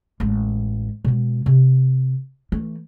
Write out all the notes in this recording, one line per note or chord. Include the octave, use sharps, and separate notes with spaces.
A1 G#3
B2 G#3
C3
E3 A3